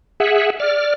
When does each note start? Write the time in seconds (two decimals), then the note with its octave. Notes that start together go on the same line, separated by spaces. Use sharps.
0.20 G#4 E5 F#5
0.60 D5 F6